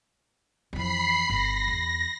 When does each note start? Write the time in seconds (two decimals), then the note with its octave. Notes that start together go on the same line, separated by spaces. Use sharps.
0.73 F2 E3 B5 C7
1.30 G1 A#6
1.67 E2